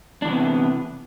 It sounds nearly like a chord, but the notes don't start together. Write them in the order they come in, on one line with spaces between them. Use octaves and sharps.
D4 E3 C3 B3